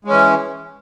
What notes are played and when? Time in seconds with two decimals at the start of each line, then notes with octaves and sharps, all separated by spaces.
0.05 G#3
0.07 C#4
0.10 E3